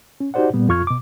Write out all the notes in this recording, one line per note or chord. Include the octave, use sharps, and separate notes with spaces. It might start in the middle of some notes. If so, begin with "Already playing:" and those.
C#4
D#4 F#4 G4 C5 D5 F#5
A#2 G3 B3
F2 F4 C#6 F6 G#6
B2 D6